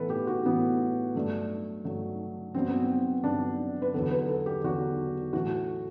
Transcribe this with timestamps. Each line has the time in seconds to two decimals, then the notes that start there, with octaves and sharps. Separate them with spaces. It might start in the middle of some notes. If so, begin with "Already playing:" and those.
Already playing: A2 E3 B3 A4 B4
0.10 G4
0.27 F#4
0.45 A2 E3 B3
1.15 G2 F#3 A3
1.84 G2 F#3 A3
2.54 G2 F#3 B3 C4
2.68 B3
2.82 C4
3.24 G2 F#3 B3 D4
3.82 B4
3.94 E2 D3 F#3 B3 A4
4.11 B4
4.29 A4
4.46 G4
4.64 E2 D3 F#3 B3 F#4
5.33 A2 E3 A3 F#4